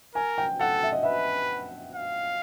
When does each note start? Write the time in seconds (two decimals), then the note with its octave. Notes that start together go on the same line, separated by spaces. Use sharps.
0.15 A#4 G#5
0.38 G5
0.60 A4 F#5
0.83 E5
0.93 D#5
1.03 B4 E5
1.95 F5